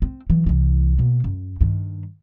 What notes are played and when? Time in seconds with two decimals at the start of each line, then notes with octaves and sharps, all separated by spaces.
0.02 C4
0.30 E3 F#3
0.46 C2 E3
0.99 B2 A#3
1.24 F#2
1.61 G2 D#3